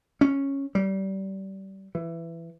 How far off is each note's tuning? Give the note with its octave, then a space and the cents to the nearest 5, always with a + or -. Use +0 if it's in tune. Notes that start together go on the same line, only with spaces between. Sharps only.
C#4 -5
G3 -25
E3 +15